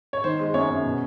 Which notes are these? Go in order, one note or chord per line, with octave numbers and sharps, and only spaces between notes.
C#5
D#3 C5
G#3
F#2 C#5
F#2
B2